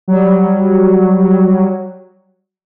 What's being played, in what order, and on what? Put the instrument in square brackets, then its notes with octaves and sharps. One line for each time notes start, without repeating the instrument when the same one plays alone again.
[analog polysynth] F#3 G3